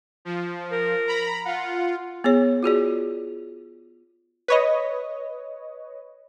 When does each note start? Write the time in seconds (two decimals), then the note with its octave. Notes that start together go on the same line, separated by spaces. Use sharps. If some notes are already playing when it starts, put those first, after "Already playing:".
0.25 F3
0.72 A#4
1.07 A#5 B5
1.46 F4 F#5
2.24 B3 G#4 C#5
2.63 F4 F#4 G#4 D5
4.48 B4 C#5 D#5